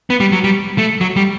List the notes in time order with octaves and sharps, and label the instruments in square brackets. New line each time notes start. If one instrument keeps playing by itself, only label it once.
[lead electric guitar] B3
G3
F#3
G3
A3
F#3
G3